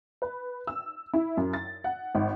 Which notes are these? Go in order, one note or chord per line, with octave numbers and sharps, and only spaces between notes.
B4
E6
E4
F#2
A6
F#5
G#1